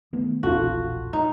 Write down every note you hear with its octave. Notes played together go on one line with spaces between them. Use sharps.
D#3 A3 B3
E1 A#1 F4 F#4 A4
D#4